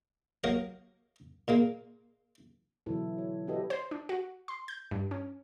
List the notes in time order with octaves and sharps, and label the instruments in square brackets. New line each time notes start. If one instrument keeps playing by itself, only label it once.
[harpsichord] F#3 A#3 A#4 D#5
A#2 G#3 A#3
[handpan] B2 D3 E3 F#3 E4 A4
C#5
D4 F#4 G4 A4 B4 D#5
[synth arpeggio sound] C5
D4
F#4
C6
G6
G2
C#4